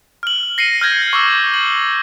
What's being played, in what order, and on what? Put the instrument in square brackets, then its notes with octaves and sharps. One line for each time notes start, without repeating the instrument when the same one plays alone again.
[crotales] F6 F#7
A#6 C7 C#7 D#7
F6 G6 G#6 A#6
C#6 D6 E6
F#7